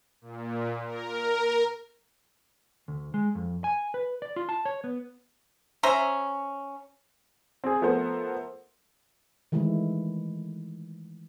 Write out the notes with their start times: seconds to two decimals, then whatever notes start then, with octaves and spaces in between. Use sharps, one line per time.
0.21 A#2
0.84 A#4
2.88 D2
3.14 G#3
3.35 F2
3.64 G#5
3.94 B4
4.22 D5
4.36 F4
4.49 A5
4.65 C#5
4.84 B3
5.83 C#4 C5 E5 A#5
7.64 C4 G#4
7.81 F3 A3 B3 A#4 C5
9.52 D#3 E3 G#3 A3 E4